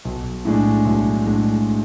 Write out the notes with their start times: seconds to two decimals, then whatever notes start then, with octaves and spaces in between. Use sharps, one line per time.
0.05 B1
0.45 A2 G#3 D4
0.85 B1
1.25 A2 G#3 D4